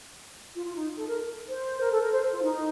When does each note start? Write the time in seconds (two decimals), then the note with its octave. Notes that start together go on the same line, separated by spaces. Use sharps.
0.55 F4
0.65 F4
0.76 D#4
0.96 A4
1.07 A#4
1.49 C5
1.80 A#4
1.91 A4
2.01 A#4
2.11 C5
2.32 F4
2.43 D#4